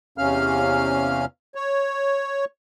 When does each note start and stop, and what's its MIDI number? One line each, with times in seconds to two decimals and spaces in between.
0.18 1.25 40
0.18 1.25 48
0.18 1.25 61
0.18 1.25 77
0.18 1.25 89
1.55 2.45 73